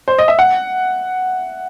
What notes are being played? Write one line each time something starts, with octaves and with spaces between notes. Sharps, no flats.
C5
D#5
E5
F#5